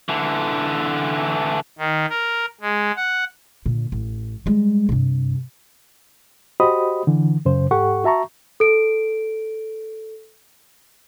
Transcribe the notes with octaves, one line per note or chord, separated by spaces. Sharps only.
D3 E3
D#3
A#4
G#3
F#5
A#2 D3
A1
G3 G#3
G2 C3
F#4 G4 C5 D#5 B5 D#6
D3 E3
F#2 C#3 C5
G#2 G4 A4 F#5 C#6
F#4 E5 A5 A#5 C#6
A4 D7